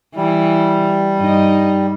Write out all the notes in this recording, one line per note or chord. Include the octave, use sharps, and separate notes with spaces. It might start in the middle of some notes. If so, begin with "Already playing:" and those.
E3 G3
G2 D#4 D#5